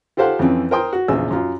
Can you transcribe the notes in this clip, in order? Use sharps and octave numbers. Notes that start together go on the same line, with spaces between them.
F4 G4 A4 C5 F5 F#5
F2 E3 C4 C#4
A#4 C5 G5 C6 D#6
F#4
A#1 E2 C#3 F4 E6
F#2 F4